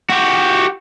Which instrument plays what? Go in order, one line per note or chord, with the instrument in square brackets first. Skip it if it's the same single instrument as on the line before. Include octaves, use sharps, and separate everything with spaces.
[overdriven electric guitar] F#4 G4